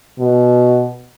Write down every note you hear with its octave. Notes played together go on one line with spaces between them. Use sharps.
B2